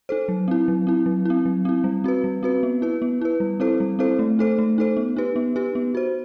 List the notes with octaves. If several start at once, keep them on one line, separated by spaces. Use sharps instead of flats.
D#4 A4 C5
F#3
C4 E4
F#3
C4 E4
F#3
C4 E4
F#3
C4 E4
G3
C4 F#4 B4
G3
C4 F#4 B4
B3
E4 B4
B3
E4 B4
G3
C4 E4 A4 C5
G3
C4 E4 A4 C5
A3
D#4 A4 C5
A3
D#4 A4 C5
B3
D#4 G4 B4
B3
D#4 G4 B4
B3
F#4 C5